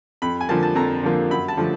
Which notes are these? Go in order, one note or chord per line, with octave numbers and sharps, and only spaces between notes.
F2 B5
G#5
D3 F3 A#3 A5
A5
F2 A#5
D3 F3 A#3
F#2 B5
A5
D3 F3 A3